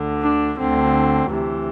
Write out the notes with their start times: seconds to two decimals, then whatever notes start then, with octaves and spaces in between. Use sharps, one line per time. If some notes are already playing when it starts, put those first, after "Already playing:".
Already playing: D2 D3
0.22 D4
0.58 D2 D3 C4
1.30 D2 C3 E3